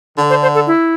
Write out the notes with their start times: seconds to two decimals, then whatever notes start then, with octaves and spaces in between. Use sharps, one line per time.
0.17 D3
0.30 C5
0.42 C5
0.55 A4
0.67 E4